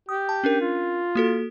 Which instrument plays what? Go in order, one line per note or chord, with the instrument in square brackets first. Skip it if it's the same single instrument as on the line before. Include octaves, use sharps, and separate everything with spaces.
[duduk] G4 [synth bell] D#6
[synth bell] A5
C#4 D4 A#4
[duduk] F4
[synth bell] A#3 F#4 A4